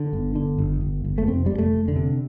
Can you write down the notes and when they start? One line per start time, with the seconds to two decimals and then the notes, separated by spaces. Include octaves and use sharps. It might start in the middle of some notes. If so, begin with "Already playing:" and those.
Already playing: D3
0.13 G1
0.35 D3
0.58 G1
0.81 G1
1.04 G1
1.18 A3
1.27 F1 C4
1.46 F1 G3
1.58 A3
1.73 F1
1.88 D3
1.96 C3